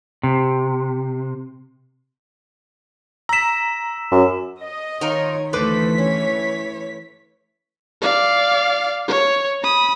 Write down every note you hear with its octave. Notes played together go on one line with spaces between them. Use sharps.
C3
A#5 E6 B6 E7
F#2
D#5
D#3 D#4 F4 A#4 C#5
D2 E3 A3 A4 B4 C5 D6 B6
C#4 C#5
D5 F5
C#5
B5 D#6